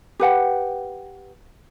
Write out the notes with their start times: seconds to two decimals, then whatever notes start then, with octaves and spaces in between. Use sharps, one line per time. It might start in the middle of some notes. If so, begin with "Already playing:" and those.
0.20 G4 B4 F#5 G5